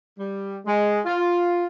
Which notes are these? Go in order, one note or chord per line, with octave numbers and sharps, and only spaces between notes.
G3
G#3
F4